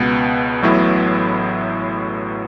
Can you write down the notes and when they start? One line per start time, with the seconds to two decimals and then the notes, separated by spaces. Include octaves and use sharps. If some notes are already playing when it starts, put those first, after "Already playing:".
Already playing: C#2 B2 B3
0.62 A1 A2 F#3 B3 E4